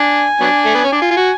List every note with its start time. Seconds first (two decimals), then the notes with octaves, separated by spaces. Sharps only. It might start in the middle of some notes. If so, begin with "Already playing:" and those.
Already playing: D4 G#5
0.40 F#3 B3 D4
0.65 A3
0.75 B3
0.84 C#4
0.92 D4
1.01 F4 G#5
1.11 F4
1.17 F#4